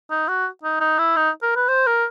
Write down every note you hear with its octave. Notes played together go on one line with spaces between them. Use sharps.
D#4
F#4
D#4
D#4
E4
D#4
A#4
B4
C5
A#4